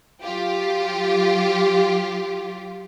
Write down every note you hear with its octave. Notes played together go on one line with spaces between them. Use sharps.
F#3 F4 G4